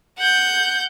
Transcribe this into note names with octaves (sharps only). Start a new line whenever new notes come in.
F#5 G6